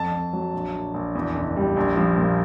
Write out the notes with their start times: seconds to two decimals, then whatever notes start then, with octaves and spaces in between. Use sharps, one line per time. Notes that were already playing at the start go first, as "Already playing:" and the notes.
Already playing: F2 A5
0.12 F2
0.33 F#3
0.53 A#1
0.74 A#1
0.94 A#1
1.15 E2
1.35 F#1
1.56 G3
1.76 A#1
1.96 F3
2.18 A#2